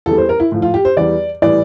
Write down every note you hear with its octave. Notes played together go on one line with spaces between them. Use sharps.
E2 E3 G3 A4
C5
A#4
E4
A2 F3
F4
G4
C5
E2 E3 G3 D5
A2 E3 G3 D5